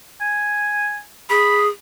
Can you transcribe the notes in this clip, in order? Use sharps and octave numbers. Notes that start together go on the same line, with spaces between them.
G#5
G#4 B5